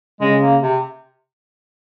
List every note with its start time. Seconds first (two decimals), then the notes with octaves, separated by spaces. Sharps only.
0.21 C#3 G#3
0.41 A#3
0.62 C3